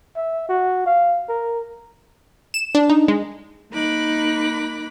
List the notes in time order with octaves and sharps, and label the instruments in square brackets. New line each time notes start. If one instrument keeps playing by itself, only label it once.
[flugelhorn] E5
F#4
F5
A#4
[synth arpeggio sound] E7
D4
D#4
G#3
[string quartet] A#3 D#4 B5 D6 F#6